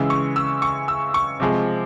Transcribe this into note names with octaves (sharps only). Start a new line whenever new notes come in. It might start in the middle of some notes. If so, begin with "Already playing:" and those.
Already playing: C#3 E3 G#3 E6
C#6
E6
C#6
E6
C#6
C3 F3 G#3